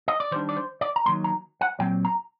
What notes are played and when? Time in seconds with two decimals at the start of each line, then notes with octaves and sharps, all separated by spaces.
0.08 D#5
0.20 D5
0.31 D#3 G3 D4 C5
0.49 D5
0.57 C5
0.81 D5
0.96 A#5
1.06 D#3 F#3 A#3 C6
1.24 A#5
1.61 F#5
1.79 A#2 F#3 C4 G5
2.05 A#5